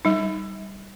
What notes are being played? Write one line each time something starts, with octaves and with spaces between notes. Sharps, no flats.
G3 D#4